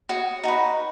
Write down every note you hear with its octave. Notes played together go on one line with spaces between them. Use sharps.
F#4 C#5 D#6
D#4 F#4 B4